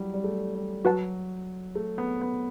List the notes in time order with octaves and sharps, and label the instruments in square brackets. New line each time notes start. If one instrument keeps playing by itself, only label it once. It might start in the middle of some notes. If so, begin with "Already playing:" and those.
Already playing: [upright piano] E3 F#3 G3
G3
A3
G3
[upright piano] F#3 [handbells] F#4 B4 F#5 A5
[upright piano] A3
B3
B3